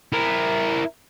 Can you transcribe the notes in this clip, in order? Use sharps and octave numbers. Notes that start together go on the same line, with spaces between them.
E4 A#4